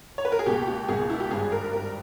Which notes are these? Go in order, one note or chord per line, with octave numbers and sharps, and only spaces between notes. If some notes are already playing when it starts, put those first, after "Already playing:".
C#5
B4
A#4
G#4
C#2 B2 A#3 G4
G4
C#2 B2 A#3 G#4
E4
G4
G#1 G2 G3 G#4
A#4
G#1 G2 G3 A#4